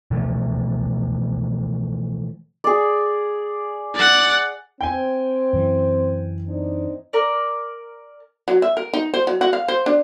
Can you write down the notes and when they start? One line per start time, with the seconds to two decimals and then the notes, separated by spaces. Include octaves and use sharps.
0.11 B2 E3 F3 A3
2.64 G#4 D5
3.95 D5 F#5
4.81 C4 G5 G#5
5.53 F#2 E3
6.47 C4 D4 D#4
7.13 A#4 D5
8.48 F#3
8.62 E5
8.77 A#4
8.94 D#4
9.14 C5
9.27 F#3
9.41 F#4
9.53 F5
9.68 C5
9.86 D4